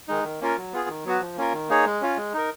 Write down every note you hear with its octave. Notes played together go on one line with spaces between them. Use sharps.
D#3 G#3 D#4
D#3
A#3 C#4 F4 A#4
F#3
B3 F4 G#4
D#3
F#3 B3 F#4
F3
A#3 C#4 F4 A#4
D#3
A#3 D#4 G#4 C#5
G#3
C#4 F4
G#3
D#4 A#4